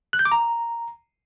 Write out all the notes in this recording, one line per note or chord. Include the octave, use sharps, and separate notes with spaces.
F#6
G6
D6
A#5